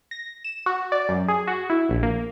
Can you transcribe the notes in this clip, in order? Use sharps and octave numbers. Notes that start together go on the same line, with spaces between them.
A#6
E7
F#4
D5
F#2
G#4
F#4
E4
A#1
A#3